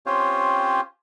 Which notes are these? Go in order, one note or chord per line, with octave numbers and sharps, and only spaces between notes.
C4 C#4 F4 G4 C5 C#5